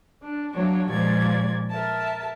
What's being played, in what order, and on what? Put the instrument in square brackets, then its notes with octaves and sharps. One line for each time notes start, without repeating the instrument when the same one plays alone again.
[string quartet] D4
E3 F#3 A#3 D4 C#5
D#2 A#2 F3 G#3 D5 G#6
A#4 E5 A5